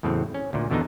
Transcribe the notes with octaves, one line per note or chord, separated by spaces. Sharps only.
E2 A2 C#3 F#3 C4
C#4
D2 A#2
E2 B2 D3 B3 D4 D#4